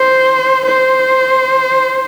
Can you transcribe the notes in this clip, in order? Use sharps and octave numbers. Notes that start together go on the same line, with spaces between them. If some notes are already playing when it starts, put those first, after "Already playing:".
Already playing: C5
C5